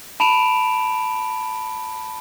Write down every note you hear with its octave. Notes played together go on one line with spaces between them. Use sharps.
A5 B5 D7 E7 F7